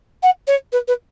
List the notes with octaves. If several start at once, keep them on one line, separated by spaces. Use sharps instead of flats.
F#5
C#5
B4
B4